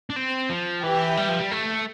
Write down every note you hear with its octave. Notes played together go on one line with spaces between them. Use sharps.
D4
C4
F3
E3 G4 B4 E5 G5
G3
F3
G3
A3